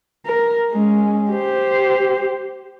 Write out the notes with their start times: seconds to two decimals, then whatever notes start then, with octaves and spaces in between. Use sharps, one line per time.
0.27 A#4
0.71 G#3 C#4
1.30 G4 C5